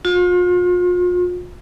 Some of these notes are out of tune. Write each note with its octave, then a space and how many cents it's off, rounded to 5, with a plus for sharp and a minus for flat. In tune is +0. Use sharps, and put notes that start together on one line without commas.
F4 +40